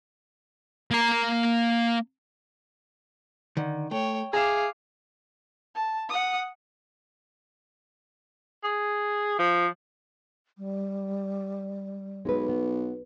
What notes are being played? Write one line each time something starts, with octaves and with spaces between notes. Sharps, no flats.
A#3 A#5
D3 D#3
A3 C#5 G5
G#4 E5 F5 A#5 D6
A5
F#5 D#6
G#4
F3
G3
B1 G#3 B4
B3